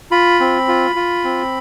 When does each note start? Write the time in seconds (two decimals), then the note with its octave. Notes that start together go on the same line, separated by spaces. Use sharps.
0.11 F4 B5
0.40 C4
0.68 F4
0.96 F4
1.24 C4